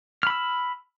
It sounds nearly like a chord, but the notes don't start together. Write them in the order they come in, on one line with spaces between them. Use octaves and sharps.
F6 B5 E6